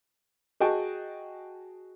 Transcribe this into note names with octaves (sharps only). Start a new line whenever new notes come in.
F#4 G#4 D#5 G5 A5 C#6